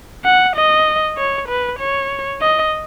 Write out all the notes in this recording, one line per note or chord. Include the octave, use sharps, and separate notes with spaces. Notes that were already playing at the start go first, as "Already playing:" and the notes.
F#5
D#5
C#5
B4
C#5
D#5